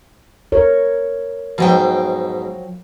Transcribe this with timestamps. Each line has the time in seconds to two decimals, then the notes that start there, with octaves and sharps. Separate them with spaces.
0.52 A#4 C#5
1.58 G#2 B2 F3 F#3 G5